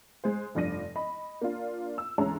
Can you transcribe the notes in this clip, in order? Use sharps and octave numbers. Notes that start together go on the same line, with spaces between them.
G#3 C5
F1 G2 F3 D5 A#6 D#7
D#5 B5
A#3 D4 F4
E6
D2 E3 G#3 C#4 A5 A#5